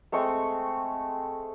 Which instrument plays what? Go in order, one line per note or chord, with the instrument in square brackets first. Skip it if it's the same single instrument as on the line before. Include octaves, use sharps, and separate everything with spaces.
[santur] G#3 A3 C4 C#6